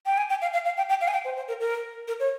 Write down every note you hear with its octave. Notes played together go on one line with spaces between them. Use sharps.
G5
G#5
G5
F5
F5
F5
G5
G5
F5
G#5
G5
C5
C5
A#4
A#4
A#4
C#5